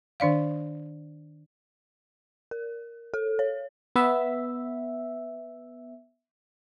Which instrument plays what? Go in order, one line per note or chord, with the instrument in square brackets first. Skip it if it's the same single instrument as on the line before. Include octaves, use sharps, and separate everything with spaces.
[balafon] D#3 D4 D5 F5
[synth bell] A#4
A4
C#5
[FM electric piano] B3 E5